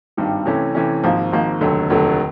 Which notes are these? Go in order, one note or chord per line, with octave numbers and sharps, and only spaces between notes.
G#1 G2 D#3 G3
C3 E3 A3 C#4
C3 E3 A3 C#4
G#1 G#2 F3 A#3
G#1 G#2 F3 A#3
F1 D#2 D3 F#3 A3
F1 D#2 D3 F#3 A3